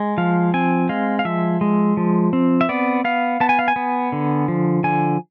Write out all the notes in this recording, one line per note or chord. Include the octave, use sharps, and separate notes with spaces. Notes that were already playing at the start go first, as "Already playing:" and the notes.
Already playing: G#3
F3 F5
C4 G#5
G#3 F5
F5
F3 E5
G#3
F3
C4
E5
B3 D5
B3 F5
B3 A5
G#5
F5
G#5
B3
D3
F3
D3 G#5